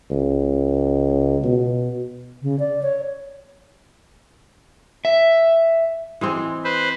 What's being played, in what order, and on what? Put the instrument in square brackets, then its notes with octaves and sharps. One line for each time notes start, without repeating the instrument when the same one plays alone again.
[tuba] C#2
B2
[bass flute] C#3
D5
C#5
[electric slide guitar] E5
[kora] E3 G#3 C4
[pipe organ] B4 C5